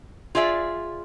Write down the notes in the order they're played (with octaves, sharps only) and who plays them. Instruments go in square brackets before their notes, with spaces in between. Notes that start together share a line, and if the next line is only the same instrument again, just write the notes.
[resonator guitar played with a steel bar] F4 G#4 D5 E5